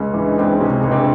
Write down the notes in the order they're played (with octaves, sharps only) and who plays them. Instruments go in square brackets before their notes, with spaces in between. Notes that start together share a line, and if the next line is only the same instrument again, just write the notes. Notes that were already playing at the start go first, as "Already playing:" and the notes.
Already playing: [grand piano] C#2 [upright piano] C#4 D#4
[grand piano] E3 [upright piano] D4
[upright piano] D#4
[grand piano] C#2 [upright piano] C4 D4
[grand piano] C3 [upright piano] C#4 D#4
[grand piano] C#2
[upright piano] C4 D4